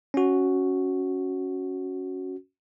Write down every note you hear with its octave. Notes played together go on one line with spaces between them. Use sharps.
C#4 F#4